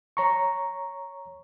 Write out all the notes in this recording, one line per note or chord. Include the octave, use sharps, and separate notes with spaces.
C#5 A#5 C#6